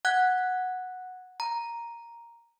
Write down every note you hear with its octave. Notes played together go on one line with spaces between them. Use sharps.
F#5 F#6 G#6
A#5